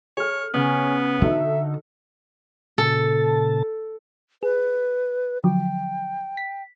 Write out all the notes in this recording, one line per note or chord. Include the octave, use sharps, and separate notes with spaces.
G#4 A4 C#5 F6
C#3 B3 C#4
D3 D#4 F#4 A4 E5
A#2 C#3 A4 A5
G#4 B4
D3 F3 F#3 G5
B6